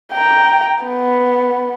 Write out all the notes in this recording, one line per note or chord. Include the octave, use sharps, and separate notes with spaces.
G5 A#5
B3